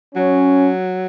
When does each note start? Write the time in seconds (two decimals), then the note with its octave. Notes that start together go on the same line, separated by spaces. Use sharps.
0.15 F#3 C#4